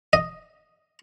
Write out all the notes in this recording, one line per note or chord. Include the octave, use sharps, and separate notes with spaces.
D#5